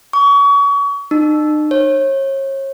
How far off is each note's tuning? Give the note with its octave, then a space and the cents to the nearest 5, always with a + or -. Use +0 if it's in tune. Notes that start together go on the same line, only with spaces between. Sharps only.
C#6 +35
D#4 -40
C#5 -35